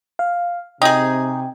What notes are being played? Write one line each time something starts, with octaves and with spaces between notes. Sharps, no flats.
F5
C3 D#4 G#4 G5